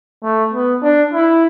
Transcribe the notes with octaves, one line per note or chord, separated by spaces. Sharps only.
A3
B3
D4
E4